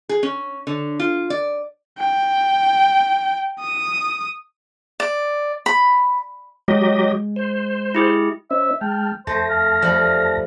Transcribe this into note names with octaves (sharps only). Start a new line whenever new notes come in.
G#4
C#4
D3
F4
D5
G5
D#6
D5
B5
F#3 G#3 G4 D#5
C5
E4 G4 G#4
C#4 C5 D#5 E5
G#3 G5 A5 F6
F2 A3 C5 A5 A#6
F5
F3 G3 A3